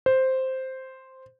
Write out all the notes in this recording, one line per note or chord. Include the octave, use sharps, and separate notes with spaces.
C5